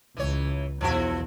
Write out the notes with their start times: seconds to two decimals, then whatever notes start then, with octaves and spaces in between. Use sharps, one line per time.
0.17 C#2 E3 C#5
0.81 B1 E2 F3 E4 F#4